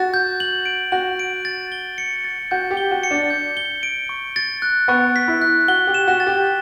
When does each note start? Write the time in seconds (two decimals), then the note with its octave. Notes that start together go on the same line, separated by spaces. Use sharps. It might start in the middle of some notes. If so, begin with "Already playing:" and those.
Already playing: F#4 A6
0.14 G6
0.40 F#7
0.66 D7
0.92 F#4 F#7
1.19 D7
1.45 A6
1.72 G7
1.98 C#7
2.24 A6
2.51 F#4 G6
2.71 G4
2.77 G7
2.91 F#4
3.03 C#7
3.11 D4
3.30 G6
3.57 G7
3.83 D7
4.09 C#6
4.36 A6
4.62 F#6
4.88 B3 C#6
5.16 B6
5.28 E4
5.42 F#6
5.68 F#4 G7
5.87 G4
5.94 E7
6.08 F#4
6.20 A6
6.27 G4